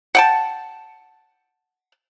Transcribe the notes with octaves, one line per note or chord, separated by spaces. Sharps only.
F#5 G5 A5